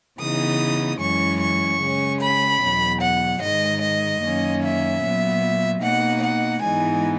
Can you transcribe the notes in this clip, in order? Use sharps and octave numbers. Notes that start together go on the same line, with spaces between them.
C#3 E3 B3 D#4 D#6
F#2 E3 G#3 C#4 C#6
C#6
C#3 G#3 C#4
B5
E2 B2 F#3
F#5
G#2 D#3 G#3 D#5
D#5
F#2 D#3 A#3 C#4
E5
A#2 F#3 B3
B2 A#3 D#4 F#5
F#5
G#2 E3 G#3 B3 D#4 G#5